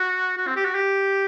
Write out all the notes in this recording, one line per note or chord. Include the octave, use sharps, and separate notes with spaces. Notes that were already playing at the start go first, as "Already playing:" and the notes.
Already playing: F#4
F#4
C4
G4
F#4
G4